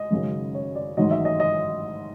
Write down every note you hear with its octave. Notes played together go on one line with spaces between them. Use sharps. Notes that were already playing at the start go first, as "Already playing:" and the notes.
Already playing: D#5
G#1 F#2 C#3 F#3
C#5
D5
A1 G#2 D#3 F#3 D#5
E5
D#5
D#5